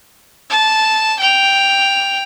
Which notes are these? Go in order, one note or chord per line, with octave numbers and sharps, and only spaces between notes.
A5
G5 F7